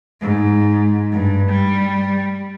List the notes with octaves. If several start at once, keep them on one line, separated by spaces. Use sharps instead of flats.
G#2
G2
G3